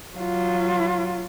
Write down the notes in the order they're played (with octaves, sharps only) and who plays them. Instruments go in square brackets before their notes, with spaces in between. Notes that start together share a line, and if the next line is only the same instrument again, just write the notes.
[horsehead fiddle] F#3 F4